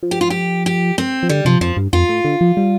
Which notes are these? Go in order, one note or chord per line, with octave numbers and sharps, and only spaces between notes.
F3
G4
F4
G4
G4
C4
F3
D3 G3
C3 F3
F2 F3
G2
F2 F4
A2
D3
F3
G3